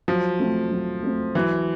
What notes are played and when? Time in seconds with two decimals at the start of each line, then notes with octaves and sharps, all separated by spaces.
0.08 F3 F#3
0.39 A3 C4
0.71 F#3
1.02 A3 C4
1.35 E3 F#3